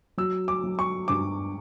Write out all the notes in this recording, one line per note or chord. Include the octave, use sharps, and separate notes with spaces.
F#3 E6
D6
F#3
C#6
G2 D6